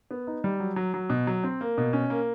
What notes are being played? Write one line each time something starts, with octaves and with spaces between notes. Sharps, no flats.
B3
D#4
G3
F#3
F#3
F#3
B2
F#3
C4
A#3
B2
C#4
A#3